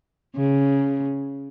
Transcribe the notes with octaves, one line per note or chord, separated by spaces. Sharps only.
C#3